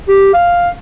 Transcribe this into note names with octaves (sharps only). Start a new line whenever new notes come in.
G4
F5